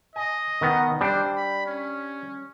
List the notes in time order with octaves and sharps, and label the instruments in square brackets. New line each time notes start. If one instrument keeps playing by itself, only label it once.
[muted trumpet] D#5 [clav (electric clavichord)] G#5
[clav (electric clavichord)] D#3 B3
[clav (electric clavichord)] G3 D4 [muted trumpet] C5
[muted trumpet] B5
C#4